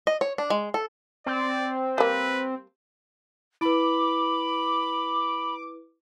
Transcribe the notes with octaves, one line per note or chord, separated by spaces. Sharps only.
D#5
C#5
D4
G#3
A4
C4 D5
G3 A#3 B4
E4 B4 B5 D6